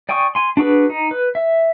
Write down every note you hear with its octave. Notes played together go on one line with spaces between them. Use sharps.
D5 G5 G#5 C#6 D#6
G#5 C6
D4 F#4 G#4 B4
D#4
B4
E5